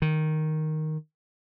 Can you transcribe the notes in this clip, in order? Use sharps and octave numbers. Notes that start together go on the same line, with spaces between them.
D#3